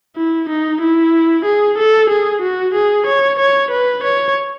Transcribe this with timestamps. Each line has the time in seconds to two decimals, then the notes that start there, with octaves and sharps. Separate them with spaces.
0.16 E4
0.49 D#4
0.81 E4
1.45 G#4
1.78 A4
2.10 G#4
2.42 F#4
2.74 G#4
3.06 C#5
3.39 C#5
3.71 B4
4.04 C#5